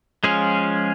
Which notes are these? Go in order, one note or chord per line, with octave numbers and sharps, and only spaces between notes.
F3 G#3 C#4 F4 G#4